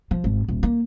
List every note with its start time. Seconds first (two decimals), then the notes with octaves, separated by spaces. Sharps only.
0.11 F3
0.24 G#1
0.48 D#1
0.63 A#3